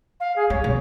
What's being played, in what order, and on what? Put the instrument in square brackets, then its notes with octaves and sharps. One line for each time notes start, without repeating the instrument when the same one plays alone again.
[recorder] F5
G#4
[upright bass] G3 [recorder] C#5
[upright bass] B2